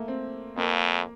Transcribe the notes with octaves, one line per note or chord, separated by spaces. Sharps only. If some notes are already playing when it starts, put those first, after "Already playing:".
Already playing: A3 A#3
C4
F2 A#3